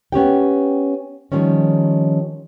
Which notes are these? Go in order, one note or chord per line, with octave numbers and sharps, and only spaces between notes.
B3 C#4 G4 G5
D#3 F3 G3 C#4